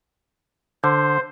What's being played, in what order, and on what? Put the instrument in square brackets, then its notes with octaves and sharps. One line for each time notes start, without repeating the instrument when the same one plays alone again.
[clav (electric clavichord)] D3 [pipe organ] C5